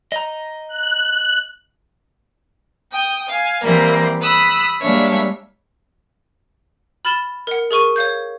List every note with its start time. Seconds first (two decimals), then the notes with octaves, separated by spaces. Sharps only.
0.12 D#5 A#5
0.68 F#6
2.91 G5 D#6
3.30 F5 G#5
3.62 E3 G3 A#3 C4
4.22 B5 D#6 E6 F#6
4.81 G3 G#3 A#3 D4 C#5 E5
7.05 B5 F6 A6 E7 G7
7.47 A#4 F#5
7.71 G#4 A#4 C#6 D#7
7.96 C#5 F5 G6